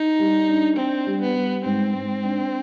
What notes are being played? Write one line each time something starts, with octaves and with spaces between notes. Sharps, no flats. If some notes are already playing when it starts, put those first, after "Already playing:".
Already playing: D#4
G3
D4
C4 D4
G3
B3
G3
G#2 C4
G#2
D4